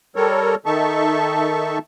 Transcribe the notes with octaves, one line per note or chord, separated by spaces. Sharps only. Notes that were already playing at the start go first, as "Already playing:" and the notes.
G3 A4 A#4 C#5
D#3 D#4 A4 E5 A5 C#6